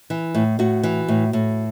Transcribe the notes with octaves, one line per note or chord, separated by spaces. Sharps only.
E3
A2
A2 F#4
E3
A2
A2